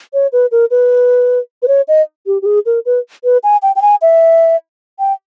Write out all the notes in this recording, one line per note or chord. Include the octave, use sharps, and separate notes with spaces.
C#5
B4
A#4
B4
B4
C#5
D#5
G4
G4
G#4
A#4
B4
B4
G#5
G5
G5
G#5
E5
G5